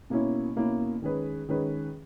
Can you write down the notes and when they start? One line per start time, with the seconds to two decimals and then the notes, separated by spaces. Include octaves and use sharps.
0.10 B2 A#3 C#4 E4
0.56 B2 A#3 C#4 E4
1.02 D#3 G#3 C#4 G#4 B4
1.49 D#3 G#3 C#4 G#4 B4